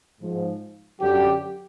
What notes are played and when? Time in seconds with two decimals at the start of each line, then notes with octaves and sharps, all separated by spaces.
0.21 G#2 F3
1.00 F#2 D3 F#3 G4